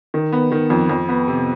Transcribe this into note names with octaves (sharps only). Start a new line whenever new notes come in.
D#3
B3
D#3
F2
F2
B3
C3